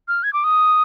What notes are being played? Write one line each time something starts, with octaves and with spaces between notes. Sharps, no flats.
F6
G#6
D6
D#6